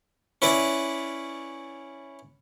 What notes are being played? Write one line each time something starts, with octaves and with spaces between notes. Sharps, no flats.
C#4 E4 B4 D5